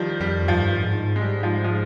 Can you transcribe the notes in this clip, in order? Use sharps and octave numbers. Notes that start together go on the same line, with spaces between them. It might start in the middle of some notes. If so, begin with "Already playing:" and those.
Already playing: D#3 F3 G3
F2 G3
G2 F3
G#2
G#3
G3
F3
F3